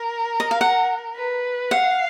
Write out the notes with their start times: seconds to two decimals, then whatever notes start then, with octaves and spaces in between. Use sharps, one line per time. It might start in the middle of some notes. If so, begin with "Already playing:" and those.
Already playing: A#4
0.40 D#5
0.51 F5
0.61 F#5
1.16 B4
1.71 F5 F#5